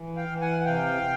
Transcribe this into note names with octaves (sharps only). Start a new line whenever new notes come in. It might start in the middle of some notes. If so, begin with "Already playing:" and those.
Already playing: E3
F5 G5
E3
F#5 G#5
F#5
C3 F5 G5